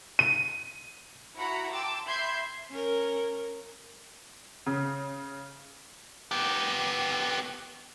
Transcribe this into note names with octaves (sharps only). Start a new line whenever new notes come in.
D#7
E4 F#4 F#5 A#5 B5
G5 A5 C6 D6 E6
E5 B5 C6 G6 G#6 C7
C#4 A#4
C#3
B3 G4